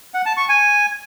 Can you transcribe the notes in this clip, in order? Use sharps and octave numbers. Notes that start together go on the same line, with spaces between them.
F#5
A5
C#6
G#5